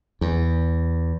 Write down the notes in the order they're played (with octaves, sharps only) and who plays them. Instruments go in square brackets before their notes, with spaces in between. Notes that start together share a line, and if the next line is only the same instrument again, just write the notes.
[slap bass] E2